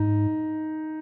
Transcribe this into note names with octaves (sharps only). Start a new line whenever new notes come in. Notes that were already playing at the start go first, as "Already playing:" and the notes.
Already playing: G#2 D#4